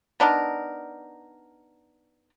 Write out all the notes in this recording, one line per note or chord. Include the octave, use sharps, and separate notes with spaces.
B3 D4 D#4 A#4